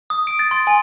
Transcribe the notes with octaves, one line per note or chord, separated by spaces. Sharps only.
D#6
D7
A6
C6
G#5